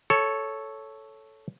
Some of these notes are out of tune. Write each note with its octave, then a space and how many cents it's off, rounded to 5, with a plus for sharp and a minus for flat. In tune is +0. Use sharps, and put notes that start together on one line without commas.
A4 -5 C#5 +0